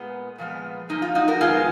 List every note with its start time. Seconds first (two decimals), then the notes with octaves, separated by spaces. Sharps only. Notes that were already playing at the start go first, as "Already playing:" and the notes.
Already playing: A#2 G#3 B3
0.38 A#2 F3 G#3 B3
0.89 F#2 F3 A#3 D#4
1.02 F4
1.15 D#4 F#4
1.28 F#4 A#4
1.40 F2 D#3 G#3 B3 F4 G#4